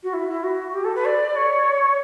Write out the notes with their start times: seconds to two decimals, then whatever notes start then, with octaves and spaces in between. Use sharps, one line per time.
0.03 F#4
0.13 E4
0.29 E4
0.44 F#4
0.74 G4
0.84 A4
0.95 B4
1.05 D5
1.36 C#5